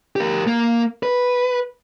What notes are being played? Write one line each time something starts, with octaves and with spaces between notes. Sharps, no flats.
G4 A#4
A#3
B4